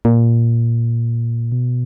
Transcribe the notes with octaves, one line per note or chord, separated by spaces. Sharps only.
A#2
B2